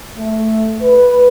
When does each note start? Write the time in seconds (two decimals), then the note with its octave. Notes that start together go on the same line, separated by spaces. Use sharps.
0.17 A3
0.82 B4